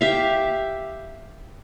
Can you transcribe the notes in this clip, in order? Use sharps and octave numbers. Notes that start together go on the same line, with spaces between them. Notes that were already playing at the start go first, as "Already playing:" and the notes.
G4 E5 F5